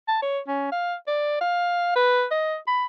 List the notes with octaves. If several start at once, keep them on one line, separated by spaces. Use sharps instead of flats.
A5
C#5
C#4
F5
D5
F5
B4
D#5
B5